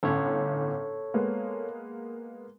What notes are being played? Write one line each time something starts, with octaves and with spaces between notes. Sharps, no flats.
G1 A2 C#4 A4 C#5
G#3 A#3 B3